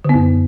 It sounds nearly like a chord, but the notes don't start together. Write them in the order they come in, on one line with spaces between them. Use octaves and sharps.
D3 B3 F#2